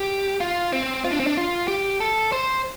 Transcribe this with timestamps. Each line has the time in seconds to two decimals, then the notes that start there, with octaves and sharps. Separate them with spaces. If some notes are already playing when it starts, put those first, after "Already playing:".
Already playing: G4
0.41 F4
0.73 C4
1.04 F4
1.12 D4
1.20 C4
1.27 D4
1.37 F4
1.68 G4
2.01 A4
2.32 C5